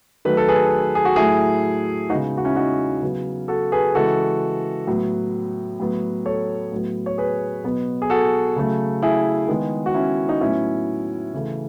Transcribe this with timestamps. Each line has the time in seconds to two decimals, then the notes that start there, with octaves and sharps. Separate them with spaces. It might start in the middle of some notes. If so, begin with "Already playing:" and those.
0.25 D#3 F#3 A3 B4
0.37 A4
0.48 G#4 B4
0.95 G#4
1.05 F#4
1.16 A2 F#3 A3 E4 G#4
2.10 C#3 G#3 B3 D#4 F#4
2.37 F#4
2.45 C#4 E4
2.56 D#4 F#4
3.02 C#3 F#3 B3
3.48 F#4 A4
3.72 G#4 B4
3.94 C#3 E3 G#3 F#4 A4
4.87 A2 F#3 B3
5.79 A2 F#3 B3
6.25 A4 C#5
6.72 A2 F#3 B3
7.06 C#5
7.18 G#4 B4
7.64 B2 F#3 B3
8.02 G#4
8.10 F#4 A4
8.56 C#3 F#3 A3
9.03 E4 G#4
9.48 D#3 G#3 B3
9.86 F#4
9.94 C#4 E4
10.29 D#4
10.41 A2 F#3 B3 C#4 E4
11.34 C#3 E3 A3